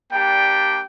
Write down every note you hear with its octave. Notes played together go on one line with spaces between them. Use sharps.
G3 A#3 D4 G4 G5